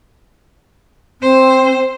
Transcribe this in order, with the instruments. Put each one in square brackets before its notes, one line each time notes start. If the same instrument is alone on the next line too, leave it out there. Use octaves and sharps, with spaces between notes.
[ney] C4 [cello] C5